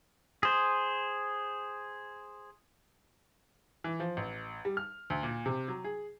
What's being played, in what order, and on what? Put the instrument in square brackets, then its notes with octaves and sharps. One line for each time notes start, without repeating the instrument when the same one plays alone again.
[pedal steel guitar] G#4 C5
[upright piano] E3
F3
A1
G3
F6
D2
A#2
C3
F#3
G#4